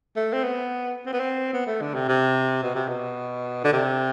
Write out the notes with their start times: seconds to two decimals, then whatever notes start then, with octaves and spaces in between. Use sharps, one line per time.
0.16 A3
0.33 C4
0.43 B3
1.06 C4
1.13 B3
1.20 C4
1.53 B3
1.67 A3
1.81 D3
1.94 C3
2.08 C3
2.63 B2
2.75 C3
2.88 B2
3.64 D3
3.72 C3